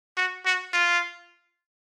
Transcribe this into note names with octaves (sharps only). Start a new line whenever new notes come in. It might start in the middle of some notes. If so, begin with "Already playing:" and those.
F#4
F#4
F4